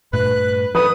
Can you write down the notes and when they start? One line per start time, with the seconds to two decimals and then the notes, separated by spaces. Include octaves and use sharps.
0.13 G2 A#2 A3 B4 F#6
0.75 D3 F3 B4 D#6